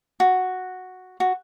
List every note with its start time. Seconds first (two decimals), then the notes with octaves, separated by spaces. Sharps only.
0.20 F#4
1.20 F#4